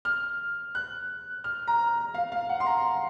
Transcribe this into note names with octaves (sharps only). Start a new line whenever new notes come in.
F6
F#6
F6
A#5
F5
F5
F#5
C6
A#5